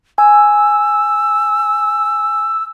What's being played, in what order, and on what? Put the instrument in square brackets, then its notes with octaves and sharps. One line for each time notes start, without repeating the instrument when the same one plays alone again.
[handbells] G#5 [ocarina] E6